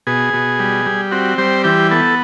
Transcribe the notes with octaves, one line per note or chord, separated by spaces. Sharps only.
B2 G#4
B2
G3
G3
C4 F#4
G3 C5
E3 G4
B3 A4